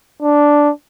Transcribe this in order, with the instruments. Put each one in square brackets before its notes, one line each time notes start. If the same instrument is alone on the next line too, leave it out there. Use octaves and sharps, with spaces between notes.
[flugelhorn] D4